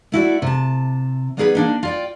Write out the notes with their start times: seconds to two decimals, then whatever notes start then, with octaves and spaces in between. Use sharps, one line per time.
0.12 A3 E4 F#4 D5
0.42 C3 A5
1.37 G3 B3 D#4 G#4 A#4 B4
1.55 A#3 D4 D#4
1.83 F4 D5 G5